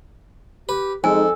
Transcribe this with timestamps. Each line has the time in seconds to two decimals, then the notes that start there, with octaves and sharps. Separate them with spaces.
0.69 G4 B4
1.04 F2 G#3 D#4 A4 G#5